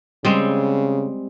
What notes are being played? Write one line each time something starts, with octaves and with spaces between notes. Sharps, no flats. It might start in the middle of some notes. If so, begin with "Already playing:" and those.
C#3 G3 G#3 C4